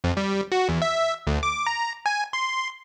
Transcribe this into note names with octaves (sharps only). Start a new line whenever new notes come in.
F2
G3
F#4
E2
E5
D2
D6
A#5
G#5
C6